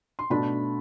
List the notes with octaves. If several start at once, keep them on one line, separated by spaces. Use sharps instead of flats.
C6
B2 A3 D4 B5